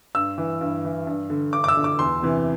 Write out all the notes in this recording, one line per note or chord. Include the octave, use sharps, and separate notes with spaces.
G2 E6
E3
G2
E3
G2
D3
G2 D6
D6
E6
D3
D6
E2 C6
C3 E3